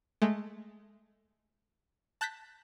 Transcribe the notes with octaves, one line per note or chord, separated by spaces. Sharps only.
G#3 A3
A5 F#6 G6 A#6 B6